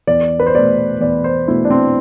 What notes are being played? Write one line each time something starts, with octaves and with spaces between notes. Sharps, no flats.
E2 D5
B4
C5
B2 A3 D5
E2 D5
C5
B2 A3 E4
D4
C4